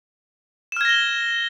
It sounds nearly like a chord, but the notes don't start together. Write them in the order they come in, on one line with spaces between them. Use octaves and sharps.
E7 F6 G#6 A#6 G7